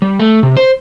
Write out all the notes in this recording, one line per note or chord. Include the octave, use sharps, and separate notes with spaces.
G3
A3
C3
C5